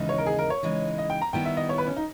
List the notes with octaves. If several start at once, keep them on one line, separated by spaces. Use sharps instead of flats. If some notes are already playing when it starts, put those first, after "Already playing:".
Already playing: D#2 C#3 E3 G#3 D#4
C#5
A#4
G#4
A#4
C#5
C#3 E3 G#3 D#4
D#5
G5
A#5
D#3 G3 B3 E4 G5
E5
D#5
C#5
B4
C#4
D#4